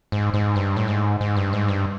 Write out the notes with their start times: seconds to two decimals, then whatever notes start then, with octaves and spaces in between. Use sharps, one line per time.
0.12 G#2
0.34 G#2
0.56 G2
0.77 A2
0.88 G#2
1.21 G#2
1.37 G2
1.53 G#2
1.69 G2